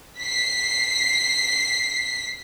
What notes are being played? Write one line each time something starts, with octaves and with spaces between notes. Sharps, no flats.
B6 C7